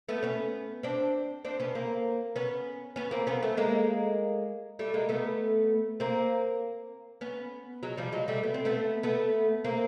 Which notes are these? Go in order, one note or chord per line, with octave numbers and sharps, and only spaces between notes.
A3 B3
B3 C#4
C4 D4
C4 D4
B3 C#4
A#3 C4
B3 C#4
B3 C#4
A#3 C4
B3 C#4
A3 B3
G#3 A#3
G3 A3
G#3 A#3
A3 B3
A#3 C4
B3 C#4
F#3 G#3
F3 G3
F#3 G#3
G3 A3
B3
C4
A3 B3
A3 B3
A#3 C4